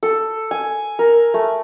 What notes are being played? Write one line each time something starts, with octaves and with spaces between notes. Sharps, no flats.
A4
G#5
A#4
A3